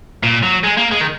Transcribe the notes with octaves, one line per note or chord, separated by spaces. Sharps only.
A#2
F#3
G#3
A#3
G#3
D#3